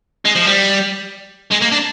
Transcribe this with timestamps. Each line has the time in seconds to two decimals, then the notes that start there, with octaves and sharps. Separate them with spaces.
0.25 G#3
0.35 F3
0.46 G3
1.52 G#3
1.62 A#3
1.72 D4